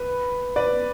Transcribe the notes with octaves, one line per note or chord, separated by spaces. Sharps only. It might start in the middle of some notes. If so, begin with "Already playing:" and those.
Already playing: B4
B4 D5